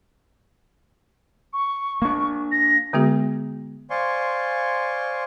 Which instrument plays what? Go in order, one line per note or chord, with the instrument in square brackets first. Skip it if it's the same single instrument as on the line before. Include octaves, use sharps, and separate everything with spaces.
[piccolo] C#6
[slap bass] A#3 D4
[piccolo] A#6
[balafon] D3 G#3 B3 F#4 G#4
[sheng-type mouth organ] C5 D5 F5 G#5 C6 C#6